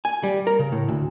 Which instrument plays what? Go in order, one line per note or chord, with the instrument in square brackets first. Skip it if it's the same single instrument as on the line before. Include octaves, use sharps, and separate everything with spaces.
[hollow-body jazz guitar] G#5
G3
A#4
C#3
A2
D2